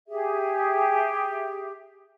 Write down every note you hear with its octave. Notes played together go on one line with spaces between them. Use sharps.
G4 G#4 E5